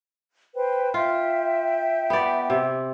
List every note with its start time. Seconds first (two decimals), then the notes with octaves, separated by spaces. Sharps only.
0.54 B4 C5 G5
0.94 F4 E5 G5
2.10 B3 D5
2.50 C3